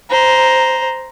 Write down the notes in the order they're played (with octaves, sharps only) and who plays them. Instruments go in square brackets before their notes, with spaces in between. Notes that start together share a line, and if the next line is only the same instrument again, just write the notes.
[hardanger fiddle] C5 A#5